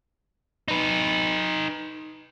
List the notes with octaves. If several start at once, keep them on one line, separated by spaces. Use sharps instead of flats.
D#4 B4